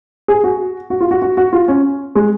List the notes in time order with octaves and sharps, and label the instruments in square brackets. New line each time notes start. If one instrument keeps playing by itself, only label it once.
[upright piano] G#4
F#4
F#4
F4
F#4
F#4
F#4
F4
C#4
G#3